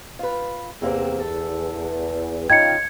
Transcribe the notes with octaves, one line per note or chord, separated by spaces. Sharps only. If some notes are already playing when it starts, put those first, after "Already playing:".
F4 B4
E2 C3 A#3 C4
A4
C#3 D#4 F4 G5 G#6 C#7